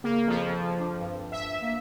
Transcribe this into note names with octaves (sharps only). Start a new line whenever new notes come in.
C#3 A#3
F2 F3
D4
G2
E5
A#3